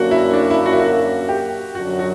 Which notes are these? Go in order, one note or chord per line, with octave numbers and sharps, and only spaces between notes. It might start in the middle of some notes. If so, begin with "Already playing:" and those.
Already playing: F#2 D3 A#3 F#4
E4
D4
E4
F#4
E4
F#4
G4
F#2 D3 F#3 F#4
F#4